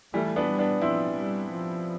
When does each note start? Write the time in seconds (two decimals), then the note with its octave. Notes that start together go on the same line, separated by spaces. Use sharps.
0.14 E3 G3 A3
0.36 B3 D4
0.48 G3
0.59 B3 D4
0.82 F3 C4 E4
1.16 G3
1.49 F3